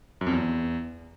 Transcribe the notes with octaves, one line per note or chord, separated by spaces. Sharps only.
F#2
F2
E2